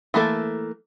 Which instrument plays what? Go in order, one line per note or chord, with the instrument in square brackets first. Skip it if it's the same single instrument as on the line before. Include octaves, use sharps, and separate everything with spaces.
[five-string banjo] E3 A3 A#3 A4